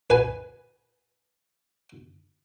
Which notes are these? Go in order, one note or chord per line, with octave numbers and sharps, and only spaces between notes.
B4 G#5